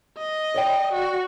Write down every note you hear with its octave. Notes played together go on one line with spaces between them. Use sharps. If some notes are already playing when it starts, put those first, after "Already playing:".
D#5
C#5 D5 G5
F#4